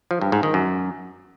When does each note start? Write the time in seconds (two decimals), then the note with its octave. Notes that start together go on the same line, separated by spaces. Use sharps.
0.11 F3
0.21 G2
0.32 G#2
0.43 D#3
0.54 F#2